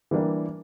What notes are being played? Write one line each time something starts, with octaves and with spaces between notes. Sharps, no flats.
E3 G3 A#3 D4 G4